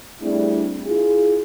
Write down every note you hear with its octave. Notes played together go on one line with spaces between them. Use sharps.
G3 A3 C4 D4 E4 G#4
E4 F4 G#4